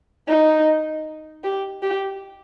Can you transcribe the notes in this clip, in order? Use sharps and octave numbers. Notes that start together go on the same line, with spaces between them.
D#4
G4
G4